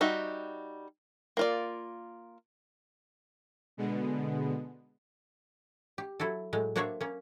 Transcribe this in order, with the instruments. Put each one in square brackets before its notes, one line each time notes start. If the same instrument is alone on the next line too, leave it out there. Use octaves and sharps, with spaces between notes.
[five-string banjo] G3 D#4 F#4 E5
A#3 F4 D5
[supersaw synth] B2 D3 G#3 B3
[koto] G4
F#3 E4 F#4 A4
A2 F#3 G#3
A#3 D4 F#4 C5 C#5 E5
A#3 C#4